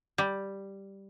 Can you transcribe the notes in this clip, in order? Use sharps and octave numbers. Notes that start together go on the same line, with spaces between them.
G3